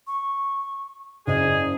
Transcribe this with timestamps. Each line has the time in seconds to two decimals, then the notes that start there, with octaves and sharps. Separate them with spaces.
0.07 C#6
1.27 F#1 G#4 D5 D#5